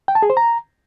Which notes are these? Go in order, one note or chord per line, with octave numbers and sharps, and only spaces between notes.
G5
A5
G#4
C5
A#5